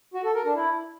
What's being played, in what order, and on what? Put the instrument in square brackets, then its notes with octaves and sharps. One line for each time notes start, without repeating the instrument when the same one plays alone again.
[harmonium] F#4
A4
A#4
D4
E4